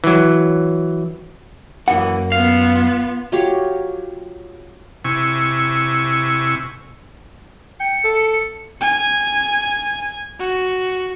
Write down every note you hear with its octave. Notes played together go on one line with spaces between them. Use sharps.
E3 F#3
F#2 E3 A#3 F#5
B3 F4 F5
F#3 F4 G4 C#5
C3 E4 G#5 C#6
G5 C#7
A4
G#5
F#4